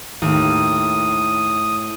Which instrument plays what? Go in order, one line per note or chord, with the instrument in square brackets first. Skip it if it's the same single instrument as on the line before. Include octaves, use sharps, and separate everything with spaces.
[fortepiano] D#2 [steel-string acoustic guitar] A2 [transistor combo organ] D#6